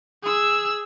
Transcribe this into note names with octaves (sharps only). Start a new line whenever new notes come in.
G#4 E6